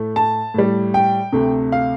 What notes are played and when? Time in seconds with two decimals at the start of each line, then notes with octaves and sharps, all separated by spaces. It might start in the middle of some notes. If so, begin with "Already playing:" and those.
Already playing: A2 A3
0.16 A5
0.54 A2 G3
0.94 G5
1.33 D2 C3 A3
1.72 F5